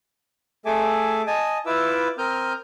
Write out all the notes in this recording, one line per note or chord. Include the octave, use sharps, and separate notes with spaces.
A3 G#4 A4 E5 G#5 D6
D#5 G#5 A5 D#6
E4 F4 B4 E5 D6 E6
C4 A#4 D#6 F6 G6